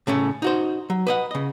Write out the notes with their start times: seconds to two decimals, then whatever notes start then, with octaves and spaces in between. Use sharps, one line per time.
0.07 A2 C#3 A3 C#4
0.42 D#4 F#4 C5
0.90 F#3
1.07 B4 D#5 F#5
1.31 C#3 D#5